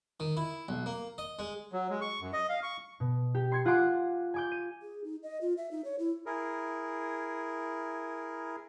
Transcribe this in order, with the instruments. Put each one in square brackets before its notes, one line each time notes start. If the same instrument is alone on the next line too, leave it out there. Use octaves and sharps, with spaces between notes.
[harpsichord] D#3
E4
B1
A#3
D#5
G#3
[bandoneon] F#3
G#3
C#6
F#2
D#5
F5
C#6
[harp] B2
G4
C6 G#6 C#7
F4 F#5 G#5 C6 D6
G#5 D6 G6
D#7
[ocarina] G#4
D#4
D#5
F4
E5
D#4
C#5
E4
[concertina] E4 G#4 A#4